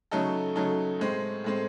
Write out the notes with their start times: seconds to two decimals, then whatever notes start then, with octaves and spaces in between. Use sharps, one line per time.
0.11 C#3 F#3 A3 D#4 A4
0.56 C#3 F#3 A3 D#4 A4
1.00 A2 G#3 C4
1.44 A2 G#3 C4